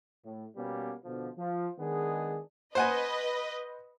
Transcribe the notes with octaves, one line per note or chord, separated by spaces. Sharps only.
A2
B2 G3 A#3 B3 C#4
B2 D3 F3
F3
D#3 G#3 B3 D4 G#4
B4 C5 D#5 F#5 G#5